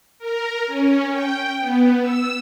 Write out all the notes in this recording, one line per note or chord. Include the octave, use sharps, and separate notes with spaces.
A#4
C#4
G5
B3
E6